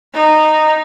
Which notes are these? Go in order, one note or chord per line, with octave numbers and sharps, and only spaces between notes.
D#4